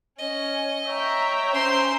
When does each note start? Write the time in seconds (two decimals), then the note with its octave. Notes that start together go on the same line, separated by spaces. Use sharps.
0.19 C#4 D#5
0.87 C#5 E5 G5 A#5
1.54 C#4 C5 C6